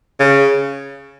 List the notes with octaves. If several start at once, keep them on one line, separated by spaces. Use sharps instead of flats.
C#3